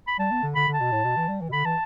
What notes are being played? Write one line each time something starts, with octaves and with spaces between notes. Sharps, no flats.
B5
G3 A5
B3
D3
D3 B5
D3
A5
B2
A2
B2
E3
G3
E3
B2
D3 B5
E3 A5